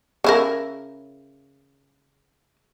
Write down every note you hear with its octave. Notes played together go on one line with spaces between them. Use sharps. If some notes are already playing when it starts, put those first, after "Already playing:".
C#3 E4 A#4